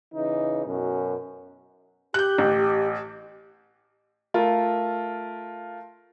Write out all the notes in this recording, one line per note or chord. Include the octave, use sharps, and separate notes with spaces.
C#3 E3 D#4
F#2 B2
G4 F#6 G6
A1
A3 F4 A#4